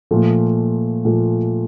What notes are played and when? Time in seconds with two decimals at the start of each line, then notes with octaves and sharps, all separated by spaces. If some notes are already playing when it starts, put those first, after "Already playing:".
0.11 A#2 F3 A3
1.05 A#2 F3 A3